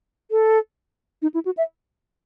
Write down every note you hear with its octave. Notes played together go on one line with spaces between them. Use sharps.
A4
D#4
E4
F#4
E5